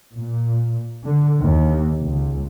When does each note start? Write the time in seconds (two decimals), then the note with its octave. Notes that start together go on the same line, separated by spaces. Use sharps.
0.14 A#2
1.03 D3
1.41 D#2
2.02 C#2